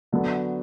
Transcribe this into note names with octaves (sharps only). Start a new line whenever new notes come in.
D3 F#3 B3